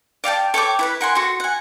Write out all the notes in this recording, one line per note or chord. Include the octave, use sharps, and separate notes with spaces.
D5 F5 G5 A5
A4 C#5 G5 D6
E4 B4 B5
A#4 F#5 G#5 C6
F#4 A4 C6
F#5 G#5